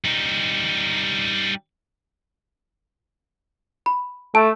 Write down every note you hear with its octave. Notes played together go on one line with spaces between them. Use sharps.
G3 D#4
B5
A3 A5